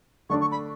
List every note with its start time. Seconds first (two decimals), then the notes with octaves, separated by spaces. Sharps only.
0.30 D3 A3 D4 A4 D5 C#6
0.41 C#6
0.51 B5